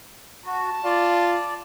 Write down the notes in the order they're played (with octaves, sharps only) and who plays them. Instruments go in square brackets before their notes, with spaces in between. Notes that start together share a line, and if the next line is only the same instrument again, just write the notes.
[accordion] F#4 [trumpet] A5
[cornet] F4 [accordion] D5